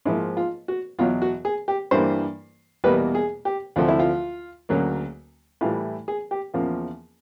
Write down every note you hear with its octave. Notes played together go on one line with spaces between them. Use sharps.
G#2 F3 A#3 E4
F4
F#4
E2 B2 F#3 F4
F#4
G#4
G4
G2 E3 G3 A#3 C5
E2 B2 G3 A#3 B4
G#4
G4
D2 C3 F3 A3 F4
E4
F4
D2 C#3 F#3 A#3
A2 E3 G3 F4
G#4
G4
E2 C#3 F3 A#3 F4